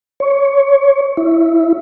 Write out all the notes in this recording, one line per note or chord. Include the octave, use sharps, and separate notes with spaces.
C#5
E4